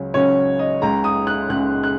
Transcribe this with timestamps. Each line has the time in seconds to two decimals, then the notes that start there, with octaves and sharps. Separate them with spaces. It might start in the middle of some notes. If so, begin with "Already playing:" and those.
Already playing: C#2 C#3 F#3 C#4
0.14 C#2 C#3 F#3 C#4 C#5
0.59 D#5
0.81 C#2 C#3 G#3 A#5
1.04 D#6
1.27 F#6
1.50 C#2 C#3 G#3 F#6
1.83 F#6